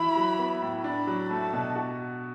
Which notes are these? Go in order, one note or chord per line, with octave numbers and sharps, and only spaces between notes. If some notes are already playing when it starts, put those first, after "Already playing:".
Already playing: E3 E4 F#4 B5
F#3
B3
A2
D4 B5
F#3
A3 A5
B2
F#4